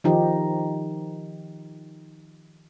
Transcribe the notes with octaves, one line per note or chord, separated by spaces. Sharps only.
D#3 F3 D#4 G4